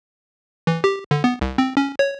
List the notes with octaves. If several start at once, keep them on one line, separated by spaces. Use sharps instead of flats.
E3
G4
D3
B3
C2
C4
C#4
C#5